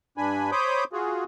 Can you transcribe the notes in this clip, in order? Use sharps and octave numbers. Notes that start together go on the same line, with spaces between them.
G2 D4 G#5 B5
C5 C#5 B5 D6 D#6 G6
F4 F#4 G#4